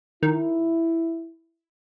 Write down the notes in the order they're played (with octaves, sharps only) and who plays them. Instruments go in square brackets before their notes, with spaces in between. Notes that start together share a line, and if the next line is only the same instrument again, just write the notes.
[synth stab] D#3 [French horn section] E4